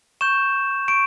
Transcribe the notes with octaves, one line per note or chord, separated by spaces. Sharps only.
C#6 G6 E7
C#6 D7